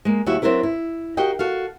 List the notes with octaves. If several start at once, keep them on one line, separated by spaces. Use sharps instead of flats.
G#3 A#3
D#2 G3 E4 F#4 E5
F#3 C4 D4 E4 A#4 B4
E4
F#4 G4 A#4 D#5 F5 G5
F#4 A4 F5